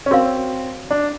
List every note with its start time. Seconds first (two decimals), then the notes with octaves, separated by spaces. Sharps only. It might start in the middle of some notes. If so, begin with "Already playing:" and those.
0.06 C#4
0.11 C4 F#4 A#4 C#5 F5
0.91 D4